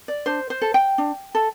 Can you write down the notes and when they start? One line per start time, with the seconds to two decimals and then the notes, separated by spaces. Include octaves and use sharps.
0.08 D5
0.26 D4 C5
0.50 C5
0.62 A4
0.74 G5
0.98 D4
1.35 A4